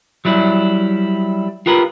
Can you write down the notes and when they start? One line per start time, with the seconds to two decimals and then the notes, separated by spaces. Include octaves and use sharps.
0.25 F#3 G3 E4
1.66 F4 G4 A#4 B4